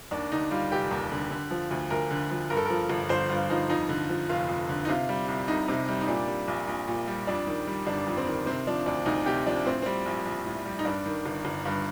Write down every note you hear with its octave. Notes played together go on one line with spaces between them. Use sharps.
D#2 D4
D3 D#4
G3 F4
F1 G4
D#2
D3
D3
F3
D2
D2 A#4
D3
F3
G2 A#4
A4
F3 A#4
G1
G1 C5
G2 F4
F3 D#4
F2 D#4
D3
F3
F1 F4
F2
D3
D#4
C3 F4
G3
C2
C2 D#4
C3
G3
D#4
A#2 D4
G3
A#1
A#1
A#2
G3
F2 D4
D#3
G3
G1 D4
F2
C4
D#3
C3 C4
F3 D4
D2 D4
D2 D#4
C3 G4
F3 D4
A2 C4
G3 C4
A#1
A#1
A2
G3
D#4
G2 D4
D#3
G1
G1
G2